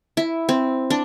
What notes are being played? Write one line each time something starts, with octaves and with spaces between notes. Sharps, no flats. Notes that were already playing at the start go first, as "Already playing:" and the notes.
E4
C4
D4